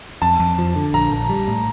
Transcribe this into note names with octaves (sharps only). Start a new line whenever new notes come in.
F2 A5
F2
F3
D3
A#1 A#5
A#1
G3
A2